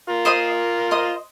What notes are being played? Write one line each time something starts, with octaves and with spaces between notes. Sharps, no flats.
F4 A#4
C5 D#5 C6 D#6
C5 D#5 C6 D#6